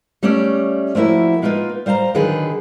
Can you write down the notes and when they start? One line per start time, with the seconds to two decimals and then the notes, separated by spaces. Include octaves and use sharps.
0.23 G3 A3 C#4 C#5 D5
0.95 F3 A3 A#3 E4 F#4
1.42 G#3 A#3 D#4 F4 B4
1.86 G3 C5 F5 A5 A#5
2.14 D3 D#3 F#3 D#4 G#4 B4